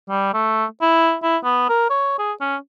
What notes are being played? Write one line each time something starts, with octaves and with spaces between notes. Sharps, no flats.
G3
A3
E4
E4
B3
A#4
C#5
G#4
C#4